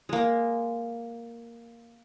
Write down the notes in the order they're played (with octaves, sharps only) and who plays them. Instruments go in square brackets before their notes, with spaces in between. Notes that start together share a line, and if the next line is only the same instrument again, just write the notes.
[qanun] G#3 A#3